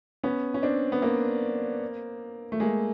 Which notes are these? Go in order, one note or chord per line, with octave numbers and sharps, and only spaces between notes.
B3 C#4
C#4
C4 D4
B3
A#3 C4
A3
G#3 A#3